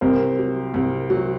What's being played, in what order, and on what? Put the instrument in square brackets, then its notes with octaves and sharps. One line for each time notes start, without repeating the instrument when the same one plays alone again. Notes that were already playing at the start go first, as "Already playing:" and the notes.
[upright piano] C2 A#4 C5
F#3
C2
F#3